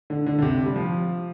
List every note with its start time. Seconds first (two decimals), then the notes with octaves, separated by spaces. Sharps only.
0.10 D3
0.26 D3
0.38 D3
0.42 C3
0.66 G3
0.76 F3